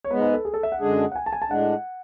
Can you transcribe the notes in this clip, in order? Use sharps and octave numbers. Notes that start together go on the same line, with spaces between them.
C#5
G#2 G#3 B3 B4
B4
A4
G#4
A4
E5
F#5
F#2 D3 G#3 D4 G#4
F#5
G#5
A5
G#5
A5
A2 G#3 D4 F#5